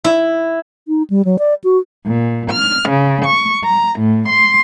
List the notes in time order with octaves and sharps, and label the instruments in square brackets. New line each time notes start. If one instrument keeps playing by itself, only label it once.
[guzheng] E4
[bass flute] D#4
G3
F#3
D5
F#4
[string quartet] A#2
F6
C#3
C#6
A#5
A2
C6